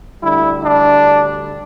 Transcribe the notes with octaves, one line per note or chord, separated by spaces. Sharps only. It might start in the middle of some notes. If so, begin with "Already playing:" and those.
D2 D3 G3 E4
D4